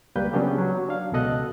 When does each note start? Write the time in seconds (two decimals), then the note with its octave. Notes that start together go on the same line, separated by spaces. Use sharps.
0.16 C#2 G3 A#3 B4 G6
0.33 C#3 F#3 B3 C#4 D4 G4
0.58 F#3
0.89 D4 F5
1.13 C#2 B2 A4 D#5 F#6